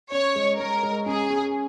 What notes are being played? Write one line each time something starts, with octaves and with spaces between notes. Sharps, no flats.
C#4 C#5
G#3
G#3 A#4
G#3
C#4 G#4
C#4